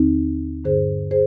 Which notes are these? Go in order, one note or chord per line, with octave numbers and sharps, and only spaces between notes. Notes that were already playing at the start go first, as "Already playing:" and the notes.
Already playing: D#2 D3 C4 D#4
G2 D3 G#4 C5
G#4 C5